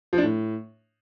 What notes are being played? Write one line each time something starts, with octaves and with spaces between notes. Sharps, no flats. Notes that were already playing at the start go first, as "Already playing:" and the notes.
F3
D4
A2